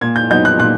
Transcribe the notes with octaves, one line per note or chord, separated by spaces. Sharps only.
A#2 G#6
G6
F#3 B3 D#4 G6
F#6
A#2 F#6